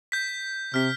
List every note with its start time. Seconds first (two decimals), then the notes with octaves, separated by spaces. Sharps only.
0.12 G6 B6
0.74 C3 F6 B6